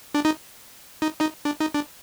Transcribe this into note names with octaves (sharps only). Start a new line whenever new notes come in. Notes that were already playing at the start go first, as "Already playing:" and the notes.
D4
D#4
D#4
D#4
D4
D#4
D4